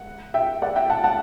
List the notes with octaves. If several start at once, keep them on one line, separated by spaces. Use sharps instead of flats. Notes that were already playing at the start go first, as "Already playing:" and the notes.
Already playing: F#5
E5 G5
D5 F#5
E5 G5
F#5 A5
F#5 A5